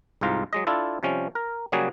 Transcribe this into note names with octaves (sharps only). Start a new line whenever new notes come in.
C2 G#2 F4 A#5
F#3 G#3 D#5
D4 E4 F4 A4
C3 F3 G3 C#4
A#4
C#3 F#3 G3 A#3 F#4 G#4